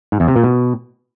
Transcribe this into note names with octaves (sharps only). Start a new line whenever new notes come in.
G#2
E2
C3
A#2
B2